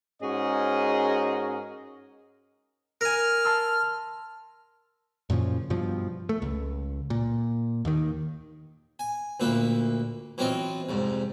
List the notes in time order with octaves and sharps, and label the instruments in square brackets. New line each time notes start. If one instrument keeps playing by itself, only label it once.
[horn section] G#2 C#4 F#4 G#4 A#4 D#5
[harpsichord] A#4 G#5 [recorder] F6
[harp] A5 C6 E6
[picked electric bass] F#2 A#2 C#3 F3
G2 B2 F3
A3
C#2
A#2
D#2 D#3
[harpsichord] G#5
D2 A#2 A#3 B4 E5
E3 F#3 C4 F4 D#5
C2 F2 G#2